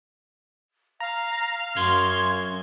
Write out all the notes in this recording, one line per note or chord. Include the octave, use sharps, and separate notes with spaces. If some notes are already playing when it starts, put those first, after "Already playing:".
F5 A#5
F#2 C6 G#6